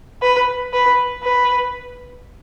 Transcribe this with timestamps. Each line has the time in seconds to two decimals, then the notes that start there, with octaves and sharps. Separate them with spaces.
0.22 B4
0.73 B4
1.23 B4